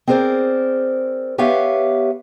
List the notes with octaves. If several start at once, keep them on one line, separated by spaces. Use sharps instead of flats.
C4 G#4 A#4 C5 D5
B3 G4 B4 C#5 E5 F5